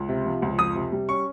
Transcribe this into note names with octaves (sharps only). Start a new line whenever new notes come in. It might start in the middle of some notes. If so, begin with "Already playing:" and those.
Already playing: C#2
C3
F3
C#2
F2 D#6
C3
G3
C#4 C#6